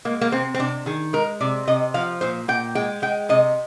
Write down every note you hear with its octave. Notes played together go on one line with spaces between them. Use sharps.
G#3 A#3
A#3
C3 C4
C4
C3 D4
D#3 G#4
G#3 A#4
C3 D5
C3 D#5
F3 F5
A#2 C5
A#2 G5
G#3 G5
G#3 G5
C3 D#5